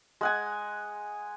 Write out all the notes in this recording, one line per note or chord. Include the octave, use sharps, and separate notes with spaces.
G#3 F#5 G#5